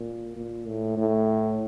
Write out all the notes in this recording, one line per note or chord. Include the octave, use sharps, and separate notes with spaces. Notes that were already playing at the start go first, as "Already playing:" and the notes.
Already playing: A#2
A#2
A2
A2